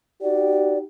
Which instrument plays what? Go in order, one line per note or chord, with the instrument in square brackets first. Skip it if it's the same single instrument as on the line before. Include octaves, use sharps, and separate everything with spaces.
[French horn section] D#4 F#4 G4 [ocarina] D5